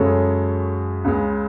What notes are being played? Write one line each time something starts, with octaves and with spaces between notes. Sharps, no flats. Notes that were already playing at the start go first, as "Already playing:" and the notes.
Already playing: F#2 C#3 G#3 A4 C#5
C#2 C#3 G#3